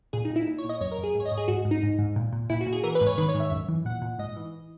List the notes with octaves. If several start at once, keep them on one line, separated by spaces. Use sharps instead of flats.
A#2 G#4
D#4
A#2
E4
A#2
C#5
A#2 D#5
F#2 C#5
A#4
F#2
G#4
G#2
C#5
D#5
G#2
G#4
G#2 F#4
G#2
D#4
G#2
G#2
A#2
A#2
A#2 E4
F#4
A#2
G#4
E3 A#4
B4
G#2
C#5
D#3 B4
C#5
G#2
E5
F#2
E3
A#2 F#5
A#2
G#2 D#5
E3